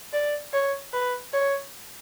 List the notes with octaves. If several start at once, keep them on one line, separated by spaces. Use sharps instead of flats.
D5
C#5
B4
C#5